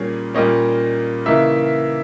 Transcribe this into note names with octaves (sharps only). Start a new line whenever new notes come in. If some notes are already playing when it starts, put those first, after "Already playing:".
Already playing: A#2 G3 A#3 C#4 G#4
A#2 G3 A#3 C#4 D#5
C#3 E3 A#3 D#4 E5